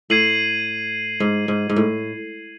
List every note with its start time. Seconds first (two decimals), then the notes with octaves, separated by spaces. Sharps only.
0.10 A2 G#6 C7 D#7 F#7
1.20 G#2
1.48 G#2
1.69 G#2
1.76 A2